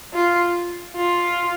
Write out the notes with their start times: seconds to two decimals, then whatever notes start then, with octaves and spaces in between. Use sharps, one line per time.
0.14 F4
0.97 F4